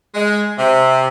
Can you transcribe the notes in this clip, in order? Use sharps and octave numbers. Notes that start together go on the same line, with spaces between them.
G#3
C3